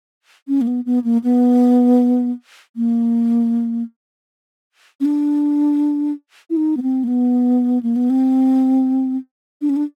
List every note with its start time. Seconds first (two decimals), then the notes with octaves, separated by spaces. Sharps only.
0.48 C#4
0.61 A#3
0.67 B3
0.86 B3
1.04 A#3
1.24 B3
2.76 A#3
5.00 C#4
5.05 D4
6.50 E4
6.57 D#4
6.77 B3
6.82 C4
7.04 A#3
7.08 B3
7.83 A#3
7.96 B3
8.10 C4
9.62 D4
9.69 C#4
9.76 D4